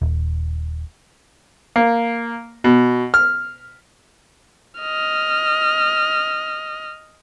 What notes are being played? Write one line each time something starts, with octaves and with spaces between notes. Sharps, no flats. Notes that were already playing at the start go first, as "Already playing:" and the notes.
D#1
A#3
B2
F6
D#5 F6